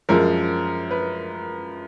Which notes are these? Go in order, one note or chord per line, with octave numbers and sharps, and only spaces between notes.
F#2 F3 G#3 A#4
B4